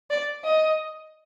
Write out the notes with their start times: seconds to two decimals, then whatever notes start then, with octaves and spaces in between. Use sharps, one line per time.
0.10 D5
0.44 D#5